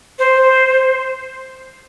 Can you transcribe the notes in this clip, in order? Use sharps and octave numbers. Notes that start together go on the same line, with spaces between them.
C5